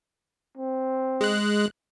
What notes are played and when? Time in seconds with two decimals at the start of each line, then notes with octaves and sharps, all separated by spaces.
0.57 C4
1.21 G#3 F#6